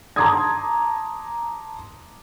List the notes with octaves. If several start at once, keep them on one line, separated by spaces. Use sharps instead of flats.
A5 A#5 C6 D6 D#6 G#6